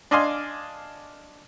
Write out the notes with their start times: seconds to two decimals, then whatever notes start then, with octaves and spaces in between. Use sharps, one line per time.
0.11 D4 D5 D#5 F5 G#5 C6